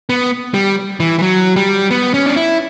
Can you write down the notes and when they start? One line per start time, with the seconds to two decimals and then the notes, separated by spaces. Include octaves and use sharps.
0.09 B3
0.54 G3
1.00 E3
1.19 E3
1.22 F#3
1.56 G3
1.91 B3
2.14 C#4
2.26 D4
2.36 E4